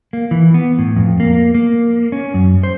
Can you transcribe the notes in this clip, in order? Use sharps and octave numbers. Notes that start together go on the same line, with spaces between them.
A#3
E3
B3
A2
F2
A#3
A#3
C#4
F#2
C5